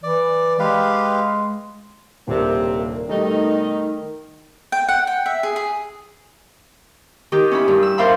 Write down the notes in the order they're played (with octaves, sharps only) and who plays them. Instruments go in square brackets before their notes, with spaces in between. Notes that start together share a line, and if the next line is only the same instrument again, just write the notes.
[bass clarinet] E3 [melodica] D5
[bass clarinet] G#3 [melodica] G4 B4 F5
[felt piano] D#1 D4 [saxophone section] C3 [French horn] A#3
[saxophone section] B2 D#4 [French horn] D#3 [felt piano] G3 A3
[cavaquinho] G5
F#5
G5
E5
G#4
G#4
[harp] D#3 D#4 G4
C#4 E4 B5
G2
E6
A#4 C5 D5 E5 F5 B5